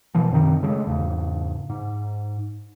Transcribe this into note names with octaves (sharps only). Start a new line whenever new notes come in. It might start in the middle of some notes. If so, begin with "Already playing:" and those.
B2 E3 F3
F#2 C3 D#3
C#3 G#3 A3
E2 G#2 C#3
G#2